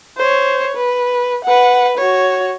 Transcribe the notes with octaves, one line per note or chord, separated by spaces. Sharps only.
C5 C#5
B4
B4 F#5
F#4 C#5